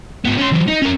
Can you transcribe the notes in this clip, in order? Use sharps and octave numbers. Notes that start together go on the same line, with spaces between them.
G#2 B3
C#4 C6
E3 F#3
D#4
C#4 A#4